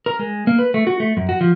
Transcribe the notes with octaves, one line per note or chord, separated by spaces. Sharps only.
A#4
G#3
A#3
B4
A3
F#4
A3
F#2
F#4
F3